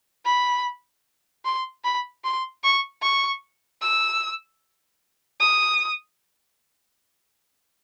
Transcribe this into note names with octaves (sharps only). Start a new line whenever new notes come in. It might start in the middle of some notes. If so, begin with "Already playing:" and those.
B5
C6
B5
C6
C#6
C#6
E6
D#6